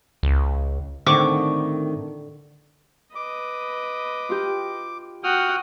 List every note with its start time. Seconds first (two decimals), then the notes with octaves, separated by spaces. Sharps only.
0.23 C#2
1.06 A2 D3 D#3 C4 C#6 D6
3.15 B4 D#5 D6
4.29 F4 G4
5.24 F#4 F#5 G5 D#6 F6